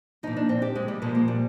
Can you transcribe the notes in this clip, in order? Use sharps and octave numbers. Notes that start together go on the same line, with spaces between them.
A#2 F3 D#4
D4
C4
G4
G#3
G3
A#2 F3 G#3
A#3
G3